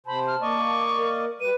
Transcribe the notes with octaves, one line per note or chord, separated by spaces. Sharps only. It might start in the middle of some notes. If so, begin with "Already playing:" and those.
C3 C5 A5 B5
F6
A#3 D5 D#5 C#6
A#4
G3 B4 D#7